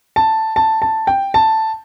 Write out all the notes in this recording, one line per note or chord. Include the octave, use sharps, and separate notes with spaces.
A5
A5
A5
G5
A5